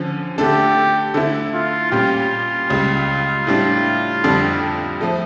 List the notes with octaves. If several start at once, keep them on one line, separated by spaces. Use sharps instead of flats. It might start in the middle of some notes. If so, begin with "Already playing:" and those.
Already playing: D3 F3 C#4
D3 A3 D4 G4 A4
D3 A3 E4
F4
A#2 G3 C#4 F4 G4
C#2 C#3 G3
A2 G3 D4
F2 D3 G3 D4
F3 A3